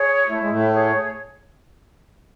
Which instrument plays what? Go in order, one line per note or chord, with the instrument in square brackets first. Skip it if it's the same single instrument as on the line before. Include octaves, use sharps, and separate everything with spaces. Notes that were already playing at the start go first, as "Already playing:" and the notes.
Already playing: [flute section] G#4 C#5
[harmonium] A3 [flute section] E4
[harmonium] G#3
A2 A3
[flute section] G#4 C#5